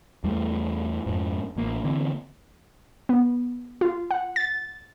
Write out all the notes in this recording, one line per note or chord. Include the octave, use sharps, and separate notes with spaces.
E2 G3 A3
F2 G#2
A1 A#3
D3 E3 A#3 C4
B3
F4
F#5
A6